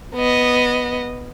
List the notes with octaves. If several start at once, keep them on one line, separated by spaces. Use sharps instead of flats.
B3 D#5